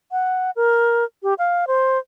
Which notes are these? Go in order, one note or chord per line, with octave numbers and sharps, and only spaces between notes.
F#5
A#4
G4
F5
C5